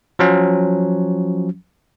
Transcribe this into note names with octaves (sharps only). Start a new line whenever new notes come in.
F3 F#3 C#4